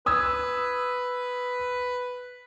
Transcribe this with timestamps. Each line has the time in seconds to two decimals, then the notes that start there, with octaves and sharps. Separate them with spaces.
0.06 B4 D#6 E6 G#6